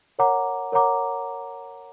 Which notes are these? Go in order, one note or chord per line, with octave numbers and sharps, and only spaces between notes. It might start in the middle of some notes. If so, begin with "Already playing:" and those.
A#4 C#5 F#5 A#5 D6
A#4 C#5 F#5 A#5 D6